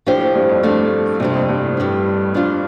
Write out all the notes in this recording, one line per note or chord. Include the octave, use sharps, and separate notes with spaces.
A2 F3 D4 G4 C5
A2
G2
F2
G2 F3 A3 D4
G2 C3 F3 C4
F2
G2
A2
G2 G3 D4
F3 D4 F4